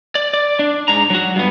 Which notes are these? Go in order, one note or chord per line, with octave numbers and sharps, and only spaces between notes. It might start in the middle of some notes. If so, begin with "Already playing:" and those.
D5
D5
D4
G#2 A#5
F#3 F#4
G2 B3